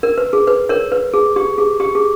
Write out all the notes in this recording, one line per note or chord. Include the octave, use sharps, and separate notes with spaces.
A#4
B4
G#4
B4
A#4 C#5
B4
G#4
G4
G#4
G4
G#4